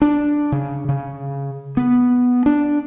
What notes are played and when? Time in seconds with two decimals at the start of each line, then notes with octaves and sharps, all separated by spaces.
0.02 D4
0.52 C#3
0.89 C#3
1.77 B3
2.46 D4